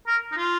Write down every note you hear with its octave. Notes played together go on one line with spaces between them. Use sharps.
A#4
D#4
F4